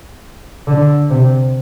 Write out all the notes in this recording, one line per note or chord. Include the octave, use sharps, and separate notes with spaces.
D3
C3